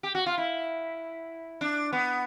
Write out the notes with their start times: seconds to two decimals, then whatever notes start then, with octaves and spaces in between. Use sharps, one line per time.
0.03 G4
0.15 F#4
0.26 F4
0.38 E4
1.61 D4
1.93 B3